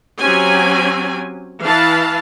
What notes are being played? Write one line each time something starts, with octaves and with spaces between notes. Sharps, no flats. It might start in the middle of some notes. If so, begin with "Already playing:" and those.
F#3 C4 C#4 G4 G#5
E3 F5 A5